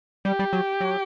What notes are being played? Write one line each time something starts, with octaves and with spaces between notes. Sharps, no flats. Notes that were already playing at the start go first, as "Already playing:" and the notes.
G3 G4
G3
F#3
F#3